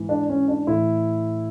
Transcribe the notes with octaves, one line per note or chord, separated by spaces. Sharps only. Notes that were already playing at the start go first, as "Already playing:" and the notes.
Already playing: G#2 E3
D4
C#4
D4
A2 E3 E4